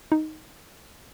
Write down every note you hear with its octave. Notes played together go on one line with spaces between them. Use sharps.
D#4